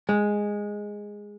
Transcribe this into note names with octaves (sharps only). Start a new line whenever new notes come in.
G#3